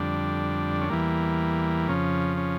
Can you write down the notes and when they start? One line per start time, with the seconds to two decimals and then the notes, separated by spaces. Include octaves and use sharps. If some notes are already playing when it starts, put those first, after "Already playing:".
Already playing: F2 D3 G3 D4
0.81 C#4
0.89 E2 E3 G3 A#3
1.88 F2 C#3 F3 C#4
2.37 C#4